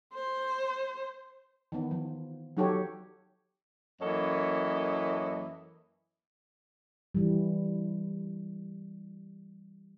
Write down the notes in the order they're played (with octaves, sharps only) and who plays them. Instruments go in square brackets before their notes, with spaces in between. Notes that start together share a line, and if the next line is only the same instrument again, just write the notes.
[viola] C5
[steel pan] D#3 E3 B3
F3
F#3 D#4 F#4 G4 A4 C#5
[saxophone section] F#2 E3 A#3 A4 C#5 D#5
[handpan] E3 G3